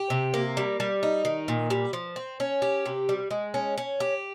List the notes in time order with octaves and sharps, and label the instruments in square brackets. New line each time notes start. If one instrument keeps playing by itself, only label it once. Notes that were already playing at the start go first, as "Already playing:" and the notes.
Already playing: [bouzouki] G4
C3
A#3
G3
G3
D#4
D#3
A#2
G3
F3
C4
C#4
G4
C3
G3
G#3
C#4
C#4
G4